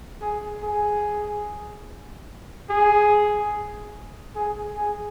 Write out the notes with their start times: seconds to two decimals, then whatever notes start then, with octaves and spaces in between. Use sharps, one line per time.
0.22 G#4
0.63 G#4
2.70 G#4
4.35 G#4
4.77 G#4